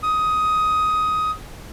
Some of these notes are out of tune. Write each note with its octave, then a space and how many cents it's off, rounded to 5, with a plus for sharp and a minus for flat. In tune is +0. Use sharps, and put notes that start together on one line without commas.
D#6 +15